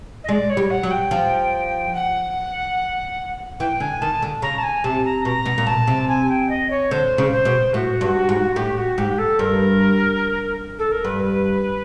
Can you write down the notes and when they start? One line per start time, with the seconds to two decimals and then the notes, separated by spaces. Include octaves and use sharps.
0.24 D#5
0.29 G#3 D5
0.50 C#5
0.57 G3
0.70 F#5
0.83 F#3
0.91 G5
1.11 F3
1.94 F#5
3.60 E3 G5
3.80 D3 G#5
4.01 D#3 A5
4.22 D3
4.42 C#3 A#5
4.58 A5
4.63 G#5
4.84 C3 A5
5.05 A#5
5.25 B2 A#5
5.46 B2
5.58 A#2
5.67 B2 A5
5.87 C3
6.08 G#5
6.29 G5
6.49 D#5
6.70 C#5
6.91 D3 C5
7.18 C#3
7.32 C5
7.45 B2
7.73 A2 F#4
8.01 G2
8.29 G#2
8.56 A2 G4
8.77 F#4
8.98 G#2 G4
9.18 A4
9.39 G2 A#4
10.78 A4
10.91 A#4
11.04 G2 B4